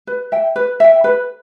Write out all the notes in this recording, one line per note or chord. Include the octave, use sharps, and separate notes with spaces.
B4
E5 G5
B4
E5 G5
B4